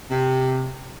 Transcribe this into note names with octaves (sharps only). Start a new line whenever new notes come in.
C3